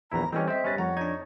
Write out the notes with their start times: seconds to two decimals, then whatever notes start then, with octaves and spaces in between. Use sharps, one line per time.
0.12 A#1 E2 E4 A#5
0.33 E3 G3 A3 C4 C#4 G4 D#5
0.48 C4 C5 D#5 E5
0.64 G3 C#4 B4 A6 A#6
0.78 F2 C#5 F#5 A#5
0.97 D4 D#4 G#6